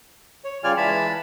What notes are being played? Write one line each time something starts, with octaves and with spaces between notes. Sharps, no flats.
C#5
C#3 G3 F4 D5 G#5 F6
E3 G#3 A5 B5